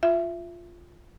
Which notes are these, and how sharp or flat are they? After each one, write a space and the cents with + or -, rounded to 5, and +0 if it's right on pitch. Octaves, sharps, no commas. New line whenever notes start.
F4 +0 E5 +20